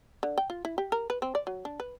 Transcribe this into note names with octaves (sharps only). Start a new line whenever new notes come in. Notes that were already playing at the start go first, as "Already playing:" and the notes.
D3
G5
F4
E4
G4
A#4
B4
C4
D5
F#3
D4
B4